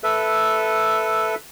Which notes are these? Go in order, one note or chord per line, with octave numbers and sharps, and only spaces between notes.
A4 B4 E5